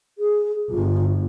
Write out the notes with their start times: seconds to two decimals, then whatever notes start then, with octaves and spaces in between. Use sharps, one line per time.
0.18 G#4
0.71 G1 F4